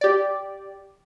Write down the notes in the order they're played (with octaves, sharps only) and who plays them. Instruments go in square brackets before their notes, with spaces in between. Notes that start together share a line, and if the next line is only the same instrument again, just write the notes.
[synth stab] G4 D5